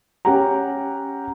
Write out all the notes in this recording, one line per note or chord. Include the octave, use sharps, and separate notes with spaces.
C#4 G4 F#5 G5 A#5